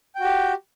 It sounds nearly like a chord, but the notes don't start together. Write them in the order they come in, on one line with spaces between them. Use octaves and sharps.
G5 F#4 G4